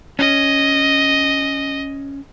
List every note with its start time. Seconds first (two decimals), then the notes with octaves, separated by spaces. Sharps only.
0.19 C#4 D#5